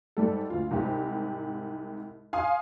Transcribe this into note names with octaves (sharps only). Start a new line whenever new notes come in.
G#2 G3 A4
D2 F4
C2 G#2 G4
F5 G#5 C6 D#6